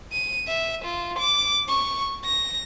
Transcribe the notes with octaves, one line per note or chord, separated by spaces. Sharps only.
D#7
E5
F4
D6
C#6
A#6